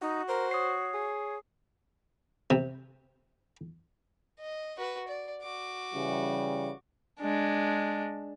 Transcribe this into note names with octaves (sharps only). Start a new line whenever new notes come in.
D#4 F#4
A#4 C5
C#5 D#6 C7
G#4
C3
D#5
F#4 B4
D5
F#4 D6
C#3 E3 G3
G#3 D4